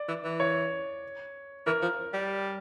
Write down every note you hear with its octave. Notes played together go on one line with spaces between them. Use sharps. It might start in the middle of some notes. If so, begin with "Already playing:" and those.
Already playing: D5
E3
E3
C#5
E3 A#4
F3
G3